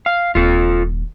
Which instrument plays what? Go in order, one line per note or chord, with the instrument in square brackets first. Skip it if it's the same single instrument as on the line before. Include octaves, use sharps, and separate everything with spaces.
[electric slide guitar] F5
[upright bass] D#1 E4 [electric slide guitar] F4 A4